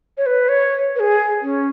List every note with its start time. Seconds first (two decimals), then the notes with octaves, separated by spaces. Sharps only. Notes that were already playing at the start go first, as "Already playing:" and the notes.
0.17 C#5
0.26 B4
0.49 C#5
0.95 B4
1.00 G#4
1.42 C#4